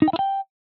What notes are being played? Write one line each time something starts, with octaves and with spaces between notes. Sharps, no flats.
D#4
G5
E4
G5